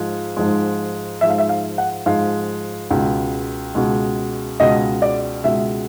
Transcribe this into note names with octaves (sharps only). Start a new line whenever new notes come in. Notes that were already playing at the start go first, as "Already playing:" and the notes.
Already playing: G#2 F3 G#3
G#2 F3 G#3
G#2 F3 G#3 E5
F5
E5
F5
F#5
G#2 F3 G#3 F5
C#2 B2 G#3
C#2 B2 G#3
C#2 B2 G#3 D#5
D5
C#2 B2 G#3 E5